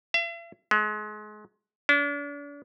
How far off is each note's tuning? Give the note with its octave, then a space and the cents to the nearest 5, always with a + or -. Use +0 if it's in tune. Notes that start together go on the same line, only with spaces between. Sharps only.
E5 +45
G#3 +30
D4 -40